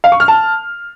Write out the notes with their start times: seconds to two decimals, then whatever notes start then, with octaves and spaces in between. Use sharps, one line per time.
0.04 F5
0.12 C#6
0.20 F6
0.28 A5